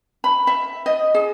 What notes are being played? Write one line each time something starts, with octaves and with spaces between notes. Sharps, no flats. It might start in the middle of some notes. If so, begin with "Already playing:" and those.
B5
E5
D#5
G#4